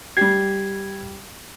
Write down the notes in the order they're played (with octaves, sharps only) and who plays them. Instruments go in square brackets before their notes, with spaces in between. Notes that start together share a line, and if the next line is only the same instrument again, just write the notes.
[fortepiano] G3 G4 [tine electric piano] G#6 C7